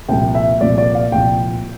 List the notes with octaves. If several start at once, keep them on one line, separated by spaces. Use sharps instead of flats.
C2 A#2 F3 G5
E5
C2 A#2 F3 D5
D5
F5
C2 A#2 F3 G5